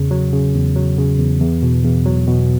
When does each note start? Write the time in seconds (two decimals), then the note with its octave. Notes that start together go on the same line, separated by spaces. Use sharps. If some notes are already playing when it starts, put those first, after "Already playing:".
Already playing: E2 C#3
0.11 F#3
0.33 C#3
0.54 E2
0.76 F#3
0.97 C#3
1.18 E2
1.41 E2
1.62 B2
1.84 E2
2.05 F#3
2.28 B2